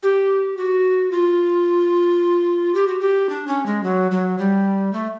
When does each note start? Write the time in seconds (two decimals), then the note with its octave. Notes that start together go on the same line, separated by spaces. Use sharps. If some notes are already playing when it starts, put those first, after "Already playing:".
0.03 G4
0.57 F#4
1.11 F4
2.75 G4
2.88 F#4
3.00 G4
3.30 D4
3.48 C#4
3.66 G#3
3.83 F#3
4.11 F#3
4.38 G3
4.93 A3